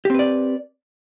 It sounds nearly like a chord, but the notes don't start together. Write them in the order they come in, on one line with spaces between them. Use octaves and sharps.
G4 C4 B4 D5